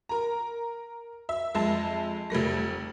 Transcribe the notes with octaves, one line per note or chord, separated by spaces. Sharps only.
A#4 A#5
E5
F2 G#3 E5 A5
F1 G3 A3 A#6